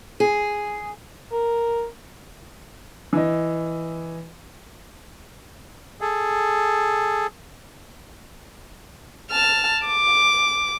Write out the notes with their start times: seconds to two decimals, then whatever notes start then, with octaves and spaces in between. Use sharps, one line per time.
0.20 G#4
1.32 A#4
3.13 E3 D#5
6.01 G#4 A4
9.31 A5 F6
9.87 D6